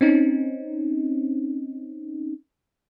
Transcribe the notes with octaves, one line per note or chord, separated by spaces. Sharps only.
C4 C#4 D#4